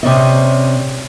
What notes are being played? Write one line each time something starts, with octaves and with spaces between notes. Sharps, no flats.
C3 C#4 D5 D#5